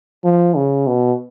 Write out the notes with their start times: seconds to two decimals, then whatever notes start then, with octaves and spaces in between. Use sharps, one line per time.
0.24 F3
0.56 C#3
0.87 B2